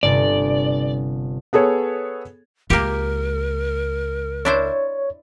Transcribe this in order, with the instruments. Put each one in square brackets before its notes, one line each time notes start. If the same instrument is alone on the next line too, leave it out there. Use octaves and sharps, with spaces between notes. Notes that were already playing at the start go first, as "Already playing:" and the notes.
[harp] G1 C3 [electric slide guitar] D5
[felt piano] B3 G#4 A4 C#5
[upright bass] C#2 [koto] A#3 G4 [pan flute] A#4
[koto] D4 E4 C5 [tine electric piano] C#5